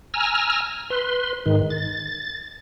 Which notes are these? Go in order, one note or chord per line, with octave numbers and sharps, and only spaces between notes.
G#5 A#5 E6 F6
B4 C6
G#2 D#3
A6